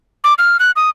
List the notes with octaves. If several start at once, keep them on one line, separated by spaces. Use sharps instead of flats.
D6
F6
F#6
D#6